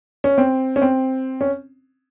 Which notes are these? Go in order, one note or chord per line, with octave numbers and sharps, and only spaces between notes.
C#4
C4
C#4
C4
C#4